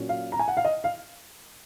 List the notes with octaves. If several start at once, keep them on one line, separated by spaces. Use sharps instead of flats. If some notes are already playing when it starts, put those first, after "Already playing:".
Already playing: A#2 F#3 C#4
F5
A#5
G#5
F#5
F5
D#5
F5